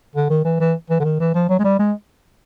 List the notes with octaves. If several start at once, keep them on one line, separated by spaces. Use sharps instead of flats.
D3
D#3
E3
E3
E3
D3
D#3
E3
F3
F#3
G#3
G3
G#3